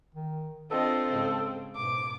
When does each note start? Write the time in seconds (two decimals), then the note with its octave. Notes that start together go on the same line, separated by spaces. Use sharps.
0.15 D#3
0.71 C4 D4 F4 A4 D#5
1.12 G#2 C#3
1.76 G#2 B2 D6